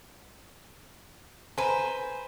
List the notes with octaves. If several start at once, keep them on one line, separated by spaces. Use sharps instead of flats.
B4 C5 G#5 A#5